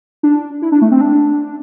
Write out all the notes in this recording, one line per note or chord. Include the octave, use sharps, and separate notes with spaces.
D4
E4
D4
A3
C4
D4